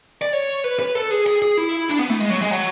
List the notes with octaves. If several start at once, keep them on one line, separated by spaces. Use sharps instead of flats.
D5
C#5
B4
B4
A4
G#4
G#4
G#4
E4
D4
B3
A3
G#3
F#3
G#3
F#3